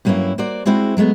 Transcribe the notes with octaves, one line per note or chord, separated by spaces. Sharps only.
G2 F#3 A#3 B3 C#4 E4
A#3 F#4 C5 D5
G#3 C4 E4 F#4 G#4
F#3 G#3 A3 B3